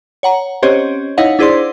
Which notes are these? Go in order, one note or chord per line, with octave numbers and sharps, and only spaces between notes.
C#5 F#5 A#5
C4 C#4 G4 C5 C#5 D#5
D#4 E4 C#5 D#5 F5 F#5
D4 E4 G#4 C5 D5 C6